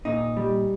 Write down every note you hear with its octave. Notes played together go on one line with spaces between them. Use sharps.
A#2 D#4
G3